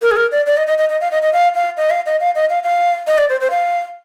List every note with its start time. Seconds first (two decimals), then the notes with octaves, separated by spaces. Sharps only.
0.02 A#4
0.11 G#4
0.16 A#4
0.32 D5
0.46 D5
0.57 D#5
0.67 D#5
0.78 D#5
0.89 D#5
1.01 F5
1.11 D#5
1.22 D#5
1.33 F5
1.55 F5
1.77 D#5
1.90 F5
2.06 D#5
2.20 F5
2.35 D#5
2.50 F5
2.63 F5
3.07 D#5
3.18 D5
3.29 C5
3.40 C5
3.51 F5